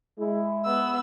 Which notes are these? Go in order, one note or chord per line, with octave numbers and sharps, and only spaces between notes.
G#3 E4
B3 E6